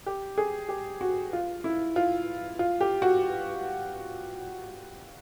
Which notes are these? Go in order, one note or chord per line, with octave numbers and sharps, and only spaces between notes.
G4
G#4
G4
F#4
F4
E4
F4
F4
G4
F#4